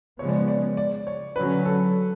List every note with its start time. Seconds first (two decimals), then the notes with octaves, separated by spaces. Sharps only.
0.19 C#3 F3 G#3 B3 C#5
0.29 D5
0.48 D5
0.77 D5
1.07 C#5
1.36 D3 F#3 C#4 B4
1.65 A4